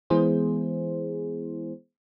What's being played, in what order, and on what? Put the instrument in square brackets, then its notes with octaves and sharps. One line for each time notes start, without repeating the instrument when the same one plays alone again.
[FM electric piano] E3 G#3 B3 E4 G#4 C5